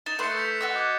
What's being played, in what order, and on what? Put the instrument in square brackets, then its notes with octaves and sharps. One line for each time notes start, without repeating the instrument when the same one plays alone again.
[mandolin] D#4 [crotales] A6 E7
[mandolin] A3 B4 C6 [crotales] G6 C#7
[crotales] G6 B6 F7
[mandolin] F#4 D#5 E6
[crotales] D6 F#6 G#6